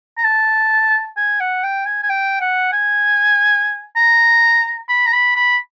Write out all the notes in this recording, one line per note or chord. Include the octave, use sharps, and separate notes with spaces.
A#5
A5
G#5
F#5
G5
G#5
G#5
G5
F#5
G#5
A#5
B5
A#5
B5
B5